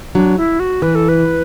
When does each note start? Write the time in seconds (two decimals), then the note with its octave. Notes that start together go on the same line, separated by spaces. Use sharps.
0.15 F#3 D4
0.37 E4
0.60 F#4
0.82 E3 B4
0.95 A4
1.09 B4